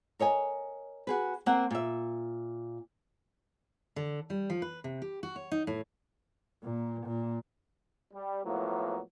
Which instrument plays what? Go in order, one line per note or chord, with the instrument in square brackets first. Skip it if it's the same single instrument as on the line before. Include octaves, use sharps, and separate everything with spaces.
[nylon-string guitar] A#4 C#5 D#5 G#5
F#4 G#4 B4
A#3 C4 A#4 F#5
A#2 E5
[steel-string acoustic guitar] D3
G3
F3
B4
C3
G4
F#4
C#5
D#4
A2
[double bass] A#2
A#2
[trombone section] G3
A2 F3 F#3 A#3 B3